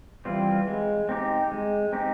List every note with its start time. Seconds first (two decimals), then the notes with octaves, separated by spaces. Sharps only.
0.25 E3 G3 C4 F4
0.67 G#3
1.09 C4 D#4 G4
1.51 G#3
1.93 C4 D#4 G4